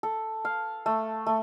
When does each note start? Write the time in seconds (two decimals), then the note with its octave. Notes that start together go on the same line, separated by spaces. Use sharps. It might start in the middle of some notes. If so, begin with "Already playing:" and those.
0.03 A4
0.45 F5
0.86 A3
1.27 A3